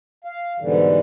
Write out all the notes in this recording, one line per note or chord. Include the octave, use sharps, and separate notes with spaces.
F5
G#2 B2 D3 E3 G3